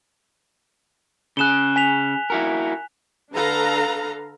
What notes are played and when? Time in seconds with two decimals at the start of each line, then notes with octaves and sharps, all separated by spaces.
1.37 C#3 G#4 F#6 E7 G7
1.76 G#5 B6 F7
2.30 E4 F#4 A#4
3.32 D3 D4 A4 B4 F5 A#5